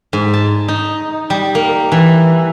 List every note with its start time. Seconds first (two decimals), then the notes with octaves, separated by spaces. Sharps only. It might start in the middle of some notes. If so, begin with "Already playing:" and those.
0.13 G#2
0.33 A5
0.68 D#4
1.30 G3
1.55 A#3
1.92 E3